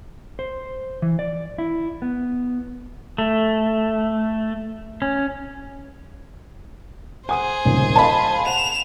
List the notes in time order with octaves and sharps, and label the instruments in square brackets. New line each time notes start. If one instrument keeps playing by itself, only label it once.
[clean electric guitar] C5
E3
D5
E4
B3
[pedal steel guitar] A3
C#4
[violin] G#4 C5 [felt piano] F#5 D#6 D#7 [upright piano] G#5
[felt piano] D#1 G#1 C#2
[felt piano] A#4 D#5 F5 [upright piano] A5 B5
[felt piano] F#5 [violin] E7 F7